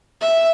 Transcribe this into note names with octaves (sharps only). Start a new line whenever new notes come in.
E5